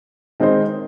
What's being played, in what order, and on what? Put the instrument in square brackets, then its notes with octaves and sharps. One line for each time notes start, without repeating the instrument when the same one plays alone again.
[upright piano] D#3 G#3 C4 D#4 C5